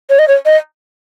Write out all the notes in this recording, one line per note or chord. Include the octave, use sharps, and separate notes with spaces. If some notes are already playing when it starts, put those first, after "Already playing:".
C#5
D#5
C#5
D#5